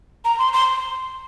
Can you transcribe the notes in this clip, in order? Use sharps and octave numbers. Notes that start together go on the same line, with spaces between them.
A#5
C6
C6